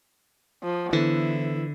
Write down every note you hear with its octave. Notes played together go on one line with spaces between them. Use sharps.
F3
D3 E3 B3 E4 A4 C5